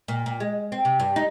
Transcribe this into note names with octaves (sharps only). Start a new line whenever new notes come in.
A#2
A#2
G#3
C4
C3
G2
D#4